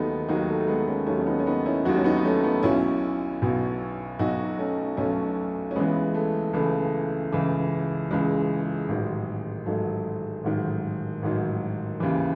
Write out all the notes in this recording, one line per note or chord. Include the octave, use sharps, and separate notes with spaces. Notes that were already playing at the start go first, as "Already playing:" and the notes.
Already playing: D#2 D#3 F#3 A3 B3 D#4
D#2 D#3 F#3 D#4 F#4
A3
A3
G#3 B3
A3 C#4
D#2 D#3 F#3 A3 C#4
C#4
B3 D#4
C#4
B3 D#4
C#4 E4
D#2 D#3 F#3 D#4 F#4
C#4
B3 D#4
D#4
A3 C#4
B3 D#4
B1 B2 F#3 C#4 E4
B1 B2 F#3
B1 B2 F#3 D#4 F#4
A3 C#4
B1 B2 F#3 A3 C#4
C#4
C#2 C#3 E3 G#3 B3
A3
C#2 C#3 E3 A3
C#2 C#3 E3
C#2 C#3 E3 G#3
A1 G#2 D#3 F#3
A1 G#2 D#3 F#3 A3
A1 G#2 D#3 F#3
A1 G#2 D#3 F#3
D#2 C#3 E3